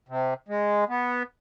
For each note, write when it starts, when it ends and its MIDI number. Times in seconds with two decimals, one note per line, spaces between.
0.09 0.34 48
0.49 0.84 56
0.89 1.23 59